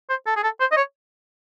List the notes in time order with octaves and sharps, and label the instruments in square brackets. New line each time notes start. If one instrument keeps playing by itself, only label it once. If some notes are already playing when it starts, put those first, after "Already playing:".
[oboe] C5
A4
G#4
A4
C5
D#5
C#5